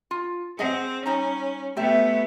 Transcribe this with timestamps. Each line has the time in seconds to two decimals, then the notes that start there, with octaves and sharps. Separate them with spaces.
0.11 F4
0.59 C4 G#4 D#5 F#5
1.06 G3 C#4 D#4 A#5
1.76 C3 A3 B3 G4 E5